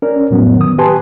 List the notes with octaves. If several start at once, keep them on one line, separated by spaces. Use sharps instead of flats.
C#4 A#4 D5
F2 A2 F#3 B3
D#3 D#6
G4 B4 G#5 A5 C6